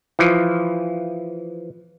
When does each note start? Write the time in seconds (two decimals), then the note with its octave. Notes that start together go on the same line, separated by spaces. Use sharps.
0.19 E3 F3